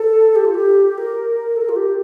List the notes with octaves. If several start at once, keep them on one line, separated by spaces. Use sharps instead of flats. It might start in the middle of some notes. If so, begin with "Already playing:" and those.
Already playing: A4
G4
F4
G4
A#4
A4
A#4
F4
G4